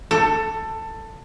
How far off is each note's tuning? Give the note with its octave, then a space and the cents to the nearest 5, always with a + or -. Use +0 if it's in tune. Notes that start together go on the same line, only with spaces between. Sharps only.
A4 +15